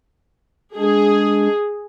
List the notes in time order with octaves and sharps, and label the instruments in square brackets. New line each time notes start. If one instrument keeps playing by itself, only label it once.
[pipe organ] G#3 D4 [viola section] G#4